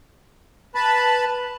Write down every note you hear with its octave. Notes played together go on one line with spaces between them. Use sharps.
B4 A5 B5